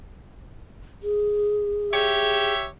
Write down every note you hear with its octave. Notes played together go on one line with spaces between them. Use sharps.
G#4
G4 C#5 E5